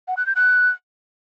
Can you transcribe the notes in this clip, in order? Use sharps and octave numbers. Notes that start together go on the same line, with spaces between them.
F#5
F#6
G6
F#6